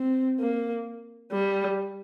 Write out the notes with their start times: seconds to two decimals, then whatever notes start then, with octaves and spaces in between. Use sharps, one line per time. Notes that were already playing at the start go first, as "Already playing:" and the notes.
Already playing: C4
0.39 A#3
1.32 G3